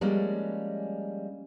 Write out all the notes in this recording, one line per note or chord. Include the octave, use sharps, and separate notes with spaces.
F3 G3 G#3 A#3 C#4